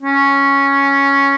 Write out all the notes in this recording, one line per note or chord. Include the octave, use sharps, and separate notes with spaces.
C#4